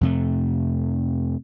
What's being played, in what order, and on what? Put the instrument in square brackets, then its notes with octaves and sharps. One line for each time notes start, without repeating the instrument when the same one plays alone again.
[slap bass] F2 C3 A3